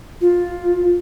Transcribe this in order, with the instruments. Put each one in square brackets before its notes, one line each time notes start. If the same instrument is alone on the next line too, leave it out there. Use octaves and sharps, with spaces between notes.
[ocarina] F4